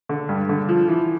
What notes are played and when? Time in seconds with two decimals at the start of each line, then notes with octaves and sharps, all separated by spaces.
0.09 D3
0.29 G2
0.49 D3
0.69 F3
0.88 E3